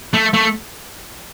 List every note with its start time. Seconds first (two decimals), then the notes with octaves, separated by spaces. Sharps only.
0.14 A3
0.34 A3